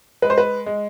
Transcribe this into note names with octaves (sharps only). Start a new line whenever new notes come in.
G#3 B4
C5
B4
G#3